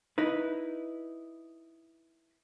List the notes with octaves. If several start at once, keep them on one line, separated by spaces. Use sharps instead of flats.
D#4 E4 B4